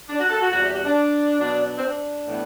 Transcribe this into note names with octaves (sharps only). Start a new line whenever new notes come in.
D4
F#4
A4
F#4
E2 C3 G3 F#4
G4
F#4
D4
B2 F#3 B3 D4
D4
C4
D4
A2 E3 B3